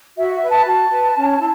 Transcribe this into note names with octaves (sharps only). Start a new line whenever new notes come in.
F#4 E5
E5
B4
A5
F#4 A5
B4
C#4
E4